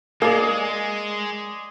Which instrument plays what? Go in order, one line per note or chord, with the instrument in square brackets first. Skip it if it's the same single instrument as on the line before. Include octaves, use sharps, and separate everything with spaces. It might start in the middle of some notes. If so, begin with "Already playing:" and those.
[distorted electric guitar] G#3 [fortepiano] A#3 [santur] G#4 D5